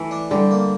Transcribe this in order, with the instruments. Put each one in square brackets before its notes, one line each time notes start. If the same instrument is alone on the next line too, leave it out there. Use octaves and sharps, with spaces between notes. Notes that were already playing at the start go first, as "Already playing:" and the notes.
Already playing: [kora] E3 A3
[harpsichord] D4
[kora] D3 [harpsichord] G3
[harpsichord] A#3